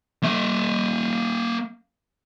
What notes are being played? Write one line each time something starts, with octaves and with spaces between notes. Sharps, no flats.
A#3 E5